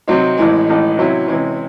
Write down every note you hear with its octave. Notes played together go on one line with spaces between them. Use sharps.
C3 F#3 C4 D#4
A1 A2 E3 G#3
A1 A2 G#3 D#4
C3 F#3 C#4 E4
C3 E3 G#3 C#4 E4